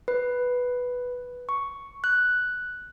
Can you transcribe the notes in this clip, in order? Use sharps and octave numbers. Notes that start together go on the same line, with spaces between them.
B4
C#6
F#6